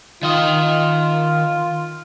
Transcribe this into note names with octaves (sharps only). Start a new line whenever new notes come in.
D#3 F4 D#5